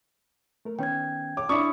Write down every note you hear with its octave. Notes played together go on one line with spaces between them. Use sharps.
A3 A#4
D#3 B3 C#4 G5 G#6
C#5 D6
D4 E4 C#6 D#6